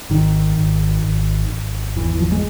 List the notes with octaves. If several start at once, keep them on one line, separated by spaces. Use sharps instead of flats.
G#1 D#3
G#1
G#1
G#1
E2 E3
F3
G#3